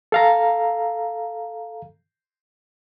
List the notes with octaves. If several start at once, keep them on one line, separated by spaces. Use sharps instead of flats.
A4 F5 A#5